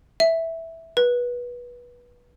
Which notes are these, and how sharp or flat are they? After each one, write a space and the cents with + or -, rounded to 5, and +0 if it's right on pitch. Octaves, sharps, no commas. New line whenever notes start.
E5 -5
B4 -20